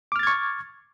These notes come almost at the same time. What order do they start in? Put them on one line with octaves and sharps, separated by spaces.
D6 F6 A6 G#6 C#6